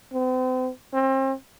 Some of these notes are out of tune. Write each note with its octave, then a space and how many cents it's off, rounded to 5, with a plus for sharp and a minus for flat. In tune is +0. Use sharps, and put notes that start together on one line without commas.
C4 -40
C4 +35